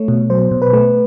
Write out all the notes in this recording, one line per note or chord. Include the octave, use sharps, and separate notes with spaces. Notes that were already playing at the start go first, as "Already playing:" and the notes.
Already playing: A3 C#5
B2
F#3 C5
B2
B4
A3